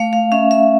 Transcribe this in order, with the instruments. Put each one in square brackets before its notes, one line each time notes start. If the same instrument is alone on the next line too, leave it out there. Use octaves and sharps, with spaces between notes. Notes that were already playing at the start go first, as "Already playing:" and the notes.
Already playing: [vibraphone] A3 F5
F5
C#4 E5
E5